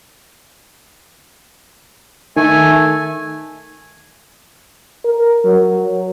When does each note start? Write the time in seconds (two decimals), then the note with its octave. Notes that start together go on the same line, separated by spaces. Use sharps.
2.36 D#3 A3 G#5
5.04 A#4
5.45 F#3